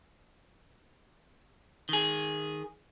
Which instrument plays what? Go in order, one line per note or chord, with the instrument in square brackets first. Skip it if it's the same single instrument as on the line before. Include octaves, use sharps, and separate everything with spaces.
[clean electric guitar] D#3 G#4